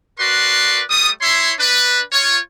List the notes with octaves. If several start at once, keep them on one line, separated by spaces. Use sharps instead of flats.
F#4 A#4 B4 D5 C6
G3 A3 D#6
E4 C#5 E5 C6
D4 B4
F4 C#5